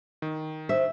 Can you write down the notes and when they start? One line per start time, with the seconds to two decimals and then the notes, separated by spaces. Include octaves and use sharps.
0.22 D#3
0.69 C5 E5